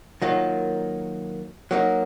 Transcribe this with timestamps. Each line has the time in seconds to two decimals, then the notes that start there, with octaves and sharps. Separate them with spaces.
0.22 D#3 F#3 A#3 F4
1.71 F#3 A#3 D#4